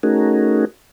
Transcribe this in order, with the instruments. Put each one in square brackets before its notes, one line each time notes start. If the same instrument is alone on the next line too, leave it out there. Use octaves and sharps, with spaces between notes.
[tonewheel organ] A3 C#4 D#4 F#4 G#4 A#4